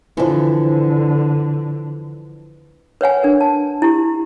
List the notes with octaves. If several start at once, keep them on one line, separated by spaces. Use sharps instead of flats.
D3 E3 F3
B4 C#5 F#5 G#5
D4 A#4
A5
E4 G4